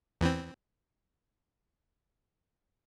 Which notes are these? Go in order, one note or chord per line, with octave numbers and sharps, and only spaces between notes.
E2 E3 C4